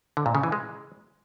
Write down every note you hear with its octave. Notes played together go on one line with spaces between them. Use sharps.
D3
A#2
C#3
E3
G#3